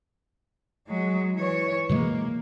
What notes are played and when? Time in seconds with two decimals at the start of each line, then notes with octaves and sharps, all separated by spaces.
0.87 F#3 G#3
1.35 E3 C#5
1.89 B2 E3 G#3 A#3